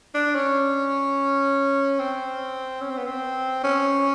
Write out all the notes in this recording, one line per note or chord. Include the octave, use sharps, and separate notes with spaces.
D4
C#4
C4
C#4
C4
B3
C4
C#4